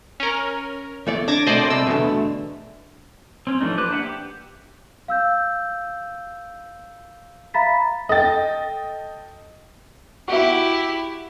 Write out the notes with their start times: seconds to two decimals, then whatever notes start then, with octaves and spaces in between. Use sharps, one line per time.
0.20 C#4 A#4
1.07 E2 A3 D5
1.28 D4 D6 G#6 A#6
1.47 C2 B2 A3 C5 D5 D#5
1.70 C2 E6
1.87 E2 B2 D3
3.47 C4 C#4
3.60 E3 F3 A3 D4 D#4
3.78 G4 B4 C5 D6 F#6
3.90 A#3 D4 E5 F#5
4.03 G4
5.08 F5 E6 G6
7.54 E5 F5 A#5 B5 A6 B6
8.09 A4 D#5 G5 A6
10.28 E4 F#4 G4 E5